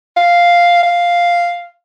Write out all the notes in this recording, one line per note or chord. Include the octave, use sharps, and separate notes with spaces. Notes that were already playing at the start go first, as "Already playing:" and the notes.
F5
F5